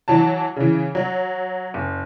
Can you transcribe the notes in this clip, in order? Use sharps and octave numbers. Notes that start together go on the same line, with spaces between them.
E3 F#3 A5
C#3 E3
F#3
F#1